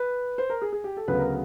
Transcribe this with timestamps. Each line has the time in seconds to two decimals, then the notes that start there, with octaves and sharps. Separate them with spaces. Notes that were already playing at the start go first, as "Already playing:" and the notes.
Already playing: B4
0.38 C5
0.50 A#4
0.62 G#4
0.73 G#4
0.84 G4
0.97 A4
1.08 D2 C#3 F#3 B3 B4
1.19 A#4